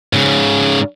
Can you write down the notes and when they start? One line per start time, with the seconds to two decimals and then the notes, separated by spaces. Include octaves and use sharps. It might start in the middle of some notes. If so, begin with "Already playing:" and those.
0.13 G#2 C#3